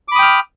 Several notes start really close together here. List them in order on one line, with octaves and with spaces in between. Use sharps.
D6 B5 D#6 G5 F6